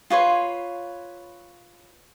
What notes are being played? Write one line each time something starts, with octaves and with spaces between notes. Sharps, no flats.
F4 B4 C#5 C6